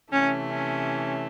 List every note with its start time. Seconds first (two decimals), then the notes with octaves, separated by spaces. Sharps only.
0.12 C3 E3 A3 C#4
0.51 C#4